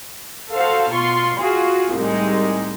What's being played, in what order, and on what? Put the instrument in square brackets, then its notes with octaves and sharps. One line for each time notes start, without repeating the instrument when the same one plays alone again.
[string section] F#4 A4 C5 F5
B2 F4 C6 C#6
F4 F#4 G#4
C2 A2 G3 G#3 D#4